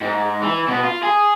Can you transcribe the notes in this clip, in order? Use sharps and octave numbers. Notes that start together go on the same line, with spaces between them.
G#2
E3
B2 B3
F4
G#4